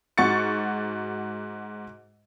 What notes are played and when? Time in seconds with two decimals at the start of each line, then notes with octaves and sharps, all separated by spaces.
0.18 G#2 F#4 C#6 A6 C#7